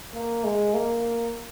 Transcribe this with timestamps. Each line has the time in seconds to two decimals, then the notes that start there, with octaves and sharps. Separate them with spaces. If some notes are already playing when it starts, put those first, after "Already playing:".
0.15 A#3
0.45 G#3
0.74 A#3